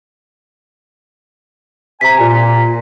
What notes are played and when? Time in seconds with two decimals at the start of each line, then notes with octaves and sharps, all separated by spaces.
2.01 C3 G#5 A#5 B6
2.19 A#2